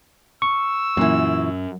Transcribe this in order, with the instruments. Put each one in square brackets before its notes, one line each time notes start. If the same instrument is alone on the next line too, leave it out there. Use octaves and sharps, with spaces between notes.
[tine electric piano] C#6 [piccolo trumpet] E6
[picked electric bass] F#2 [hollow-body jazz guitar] A#2 E3